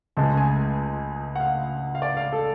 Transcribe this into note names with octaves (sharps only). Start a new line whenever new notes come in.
C#2 C#3 G#3 A5
G#5
F#5
F5
F5
D5
F5
A4